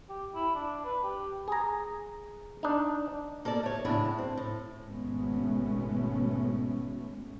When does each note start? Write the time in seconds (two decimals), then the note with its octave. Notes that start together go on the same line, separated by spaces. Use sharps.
0.09 G4
0.35 E4
0.55 D4
0.85 B4
1.03 G4
1.48 G#4 A#5
2.63 D4 D#4
3.45 A#3 A4 A#4 D5
3.63 A3 C#5
3.85 A2 C#3 F#3 D4 E4
4.18 C4
4.37 A2
4.85 G#1 B2 G#3 A3 B3 C#4